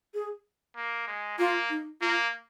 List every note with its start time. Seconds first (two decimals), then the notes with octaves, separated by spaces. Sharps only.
0.14 G#4
0.76 A#3
1.07 G#3
1.38 A#3 F4
1.70 D#4
2.01 A#3 F4